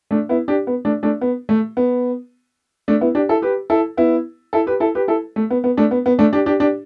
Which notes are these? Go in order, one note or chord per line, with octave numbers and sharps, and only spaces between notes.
A3 D4
B3 E4
D4 G4
B3
A3 D4
A3 D4
B3
A3
B3
A3 D4
B3 E4
D4 G4
E4 A4
G4 B4
E4 A4
B3 E4
E4 A4
G4 B4
E4 A4
G4 B4
E4 A4
A3
B3
B3
A3 D4
B3
B3
A3 D4
D4 G4
D4 G4
D4 G4